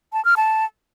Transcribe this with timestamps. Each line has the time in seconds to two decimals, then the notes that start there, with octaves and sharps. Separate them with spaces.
0.13 A5
0.25 F6
0.37 A5